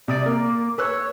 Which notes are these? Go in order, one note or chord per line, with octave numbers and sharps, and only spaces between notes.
C3 D5 D#6 D7
A#3 A#4
B4 C#5 E6 F#6